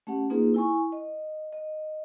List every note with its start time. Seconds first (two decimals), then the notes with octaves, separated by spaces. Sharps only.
0.07 A3 C#4 G4 F#5
0.30 A#3 C4 D#4 F4 G#4 B4
0.54 E4 G#5 C#6
0.92 D#5
1.52 D#5